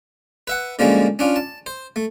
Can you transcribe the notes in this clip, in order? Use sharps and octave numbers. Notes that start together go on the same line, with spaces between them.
B4 E5 F#5
D3 F3 G3 G#3 A#3 C#4
C#4 D4 F4
A5
C5
A3